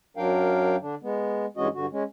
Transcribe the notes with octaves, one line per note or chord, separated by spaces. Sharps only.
F#2 F#3 D4 A#4 F5 G5
D3 D4
G#3 B3
G2 E3 G#3 C#4 F#4 D#5
G2 D3 F#4
G#3 C#4